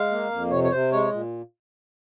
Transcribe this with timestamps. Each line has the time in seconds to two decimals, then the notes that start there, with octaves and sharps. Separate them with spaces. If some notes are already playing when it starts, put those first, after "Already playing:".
Already playing: G#3 F5
0.11 A#3
0.31 F2
0.51 C3 C#5
0.64 C#5
0.71 C3 C5
0.92 G#3 C#5
1.12 A#2